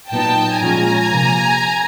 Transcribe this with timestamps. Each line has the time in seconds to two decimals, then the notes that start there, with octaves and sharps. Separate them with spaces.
0.11 A#2 F#3 B3 D#4 G5 A5
0.61 A#2 F3 G#3 C#4 F4 G#5 A#5
1.11 C3 F3 A#3